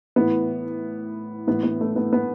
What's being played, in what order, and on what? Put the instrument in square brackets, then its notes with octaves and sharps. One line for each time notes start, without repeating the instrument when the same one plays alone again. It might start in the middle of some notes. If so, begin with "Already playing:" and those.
[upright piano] A2 E3 B3
A2 E3 B3
B3
A3
B3
B3